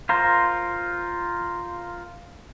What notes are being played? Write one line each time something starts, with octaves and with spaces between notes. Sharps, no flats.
F4 A#4 C5